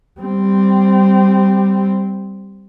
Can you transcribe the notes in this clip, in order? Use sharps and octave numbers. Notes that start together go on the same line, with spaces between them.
G3 C4